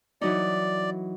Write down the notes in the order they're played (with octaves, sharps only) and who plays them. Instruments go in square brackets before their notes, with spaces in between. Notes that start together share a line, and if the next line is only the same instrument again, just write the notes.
[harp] E3 F#3 D#4 [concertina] D5